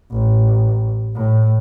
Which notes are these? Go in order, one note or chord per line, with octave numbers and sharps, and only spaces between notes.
A1
A2